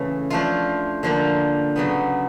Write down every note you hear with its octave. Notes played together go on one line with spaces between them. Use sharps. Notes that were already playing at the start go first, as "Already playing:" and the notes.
Already playing: C#3 E3 A3
F3 A3 D4 F4
D3 F3 A#3
C#3 F#3 B3